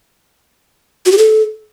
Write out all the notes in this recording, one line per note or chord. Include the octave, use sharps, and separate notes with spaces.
F#4
G4
A4